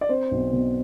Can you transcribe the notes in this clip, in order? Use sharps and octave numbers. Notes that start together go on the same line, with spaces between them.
D5
C4 C5
B1
B2